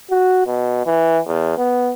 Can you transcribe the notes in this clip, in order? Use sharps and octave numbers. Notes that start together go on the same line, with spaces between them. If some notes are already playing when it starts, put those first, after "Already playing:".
F#4
B2
E3
E2
B3